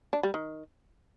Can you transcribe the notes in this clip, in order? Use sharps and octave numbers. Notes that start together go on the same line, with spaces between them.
D4
G3
D#3